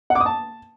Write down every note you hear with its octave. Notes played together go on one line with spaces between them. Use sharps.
F#5
D6
D#6
A5